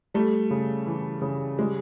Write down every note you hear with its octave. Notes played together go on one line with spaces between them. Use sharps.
G3 A3
C#3
E3
C#3
G3 G#3